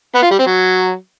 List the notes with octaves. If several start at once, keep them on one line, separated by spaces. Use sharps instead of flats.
B3
F4
G3
C4
F#3